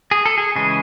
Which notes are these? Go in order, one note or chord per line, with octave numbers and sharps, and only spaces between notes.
G#4
A4
G#4
C#3 E3 G#3 G#4